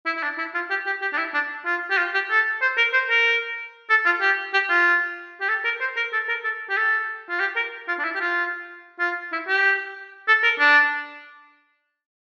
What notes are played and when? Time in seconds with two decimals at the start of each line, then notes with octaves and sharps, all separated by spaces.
0.06 E4
0.17 E4
0.23 D4
0.38 E4
0.54 F4
0.70 G4
0.86 G4
1.01 G4
1.13 D4
1.18 E4
1.34 D4
1.66 F4
1.90 G4
1.98 F4
2.14 G4
2.30 A4
2.62 C5
2.77 A#4
2.93 C5
3.09 A#4
3.90 A4
4.05 F4
4.21 G4
4.53 G4
4.69 F4
5.41 G4
5.49 A4
5.64 A#4
5.80 C5
5.97 A#4
6.13 A4
6.28 A#4
6.44 A4
6.69 G4
6.77 A4
7.29 F4
7.40 G4
7.56 A#4
7.88 F4
7.99 D4
8.04 E4
8.15 G4
8.20 F4
8.99 F4
9.32 E4
9.47 G4
10.28 A4
10.44 A#4
10.59 D4